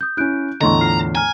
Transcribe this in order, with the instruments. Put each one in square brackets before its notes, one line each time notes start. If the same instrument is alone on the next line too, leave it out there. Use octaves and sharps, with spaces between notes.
[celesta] D#6 G6
[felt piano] C#4 E4 [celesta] F#6 G6 D7
[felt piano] E2 A2 D3 [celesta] D#5 C6 C#6 [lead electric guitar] A#5
[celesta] F4 F6 C7
[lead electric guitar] G#5 [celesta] A#5 F6